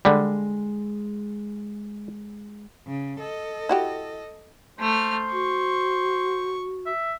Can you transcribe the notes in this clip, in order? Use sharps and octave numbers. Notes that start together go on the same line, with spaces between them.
D3 G3 G#3
C#3
A4 D#5
E4 F#4 G4
A3 C5 F6
F#4 C#6
E5